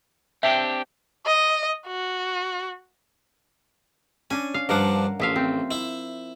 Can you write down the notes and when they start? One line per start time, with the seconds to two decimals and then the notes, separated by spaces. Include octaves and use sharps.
0.43 C4 D4 G4 E5
1.26 D#5
1.87 F#4
4.30 C#4 D4 G#5
4.54 F5
4.69 G2 F3 D4 A#4 F5 F#5
5.20 A1 F3 E5 F5
5.36 C4
5.71 E4 E5